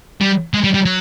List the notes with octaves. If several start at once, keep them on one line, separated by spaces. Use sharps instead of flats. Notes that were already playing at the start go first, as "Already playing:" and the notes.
G3
G#3
G3
G3
F#3